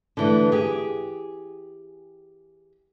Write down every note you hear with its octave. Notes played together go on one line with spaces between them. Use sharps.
D3 E3 A3
G4 G#4